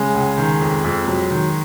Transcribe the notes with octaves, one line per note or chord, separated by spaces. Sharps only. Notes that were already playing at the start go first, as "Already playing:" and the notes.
Already playing: C#3 G#3
C#2
D#3
F2
F2
F#3
D#3